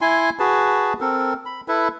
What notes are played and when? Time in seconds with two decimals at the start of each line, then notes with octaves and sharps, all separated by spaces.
0.01 E4 G#5 C6
0.39 F#4 G#4 B4 A5
1.01 C4 A4 A#4
1.45 B5
1.68 E4 A4 B4